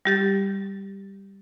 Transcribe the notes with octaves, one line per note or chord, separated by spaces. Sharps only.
G3 G4 A6